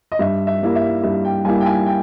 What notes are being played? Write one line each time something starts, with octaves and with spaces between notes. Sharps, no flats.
D#5
G2 E5
E5
G3 A#3 E4
E5
G2 E5
G5
G3 A#3 E4 G#5
G5
G#5
G5